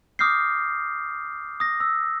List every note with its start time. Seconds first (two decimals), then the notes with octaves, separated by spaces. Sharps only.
0.19 D6 D#6 F6 G6 A#6 C7
1.60 D#6 A#6
1.80 E6